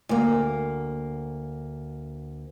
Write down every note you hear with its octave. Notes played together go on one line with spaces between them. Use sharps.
D2 A#3